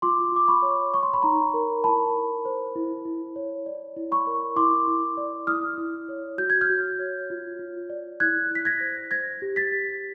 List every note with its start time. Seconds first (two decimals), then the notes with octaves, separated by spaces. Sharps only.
0.02 F4 C6 D6
0.32 F4 D6
0.48 B5 C#6
0.62 C#5
0.93 C#5 C#6
1.03 C6
1.13 B5
1.22 D#4 A#5 C6
1.54 A#4
1.84 E4 A5 B5
2.15 E4
2.45 C5
2.76 E4
3.05 E4
3.36 C#5
3.66 D5
3.96 E4
4.12 B5 C#6
4.27 A#4
4.56 E4 C6 D6
4.87 E4
5.17 D5
5.47 E4 D#6 F6
5.78 E4
6.09 C#5
6.38 F#4 G6
6.50 G#6
6.61 F6 G6
6.70 F#4
6.99 C#5
7.30 F4
7.59 F4
7.90 D5
8.20 E4 F#6 G#6
8.51 E4 B6
8.65 G#6 A#6
8.80 C5
9.11 C5 G#6 A#6
9.42 G4
9.56 A6 B6
9.72 G4